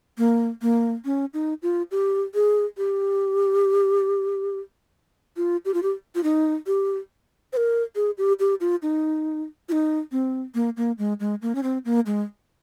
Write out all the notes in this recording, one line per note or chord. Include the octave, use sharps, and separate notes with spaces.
A#3
A#3
C#4
D#4
F4
G4
G#4
G4
F4
G4
F4
G4
F4
D#4
G4
C5
A#4
G#4
G4
G4
F4
D#4
F4
D#4
C4
A#3
A#3
G#3
G#3
A#3
C#4
C4
A#3
G#3